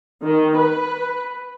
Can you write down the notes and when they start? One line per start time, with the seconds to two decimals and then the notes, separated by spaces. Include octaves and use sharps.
0.23 D#3
0.57 B4